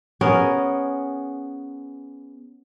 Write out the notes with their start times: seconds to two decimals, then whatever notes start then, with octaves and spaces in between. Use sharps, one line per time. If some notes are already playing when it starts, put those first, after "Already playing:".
0.21 B3 C#4 G#4 A#4